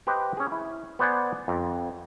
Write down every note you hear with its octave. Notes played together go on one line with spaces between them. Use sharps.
G4 B4 C5 D#5 G5
C#4 G#4
E4
B3 C5 D5 F#5 G#5
F2